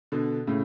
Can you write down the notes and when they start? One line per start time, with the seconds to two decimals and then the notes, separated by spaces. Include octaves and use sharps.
0.12 B2 D3
0.47 A2 C#3